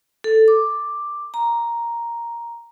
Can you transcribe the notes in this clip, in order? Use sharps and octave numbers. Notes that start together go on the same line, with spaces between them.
A4
D6
A#5